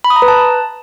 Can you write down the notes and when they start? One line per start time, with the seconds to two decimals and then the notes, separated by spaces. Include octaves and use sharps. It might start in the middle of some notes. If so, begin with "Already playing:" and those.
0.04 B5
0.10 D#6
0.16 A#5
0.22 B4
0.28 A5